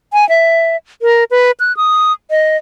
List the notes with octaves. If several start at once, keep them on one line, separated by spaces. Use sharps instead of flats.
G#5
E5
A#4
B4
F#6
D#6
D#5